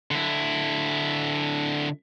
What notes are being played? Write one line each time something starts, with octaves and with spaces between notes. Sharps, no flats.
D3 E4